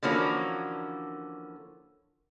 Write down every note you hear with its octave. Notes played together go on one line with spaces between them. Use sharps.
D3 E3 F3 A#3 C#4 F#4